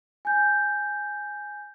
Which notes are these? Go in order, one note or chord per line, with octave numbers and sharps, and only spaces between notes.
G#5 G6